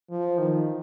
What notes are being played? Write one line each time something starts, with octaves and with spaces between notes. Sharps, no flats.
F3
D#3